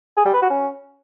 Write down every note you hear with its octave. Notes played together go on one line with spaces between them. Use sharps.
G#4
G3
B4
F#4
C#4